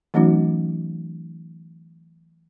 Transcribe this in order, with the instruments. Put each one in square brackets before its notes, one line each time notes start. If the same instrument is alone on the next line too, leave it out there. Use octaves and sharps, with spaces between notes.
[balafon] E3 F#3 A3 C#4 D#4 F#4